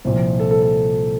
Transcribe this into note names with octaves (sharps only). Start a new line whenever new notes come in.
C2 A#2 F3 C5
A4
A4
A4